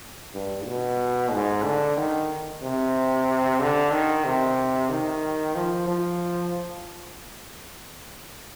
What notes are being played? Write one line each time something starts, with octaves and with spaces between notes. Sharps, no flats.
G2
B2
G#2
D3
D#3
C3
D3
D#3
C3
D#3
F3
F3